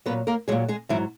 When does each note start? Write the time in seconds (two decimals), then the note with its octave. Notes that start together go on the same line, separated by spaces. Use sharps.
0.06 A#2 F#3 B3 B4
0.27 A#3 A#4
0.48 F#3 G#3 G#4
0.52 A#2
0.68 G#3 G#4
0.89 G#2 E3 F#3 E4